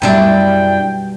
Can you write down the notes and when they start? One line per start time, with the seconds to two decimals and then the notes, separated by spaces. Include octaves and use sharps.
0.02 F#2 B2 G3 D4 E4 G5